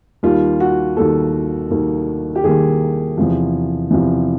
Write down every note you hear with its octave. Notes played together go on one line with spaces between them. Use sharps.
D#2 D#3 G3 A#3 F4
F#4
D#2 D#3 G3 A#3 A4
D#2 D#3 G3 A#3
G4
D#2 D#3 G3 A#3 G#4
E2 C3 F3
E2 C3 F3